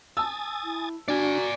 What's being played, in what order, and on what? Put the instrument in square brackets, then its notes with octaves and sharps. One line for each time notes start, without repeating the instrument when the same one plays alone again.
[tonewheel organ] G#5 D#6 A6 [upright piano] A5 E6
[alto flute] E4
[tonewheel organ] D4 [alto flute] F#4 [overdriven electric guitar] D5 G#5